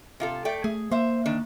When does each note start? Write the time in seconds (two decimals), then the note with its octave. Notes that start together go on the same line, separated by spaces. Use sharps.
0.20 C3 F4 A4
0.45 A3 D5 G5
0.64 A3 G#4
0.91 A#3 C5 E5
1.26 D#3 D4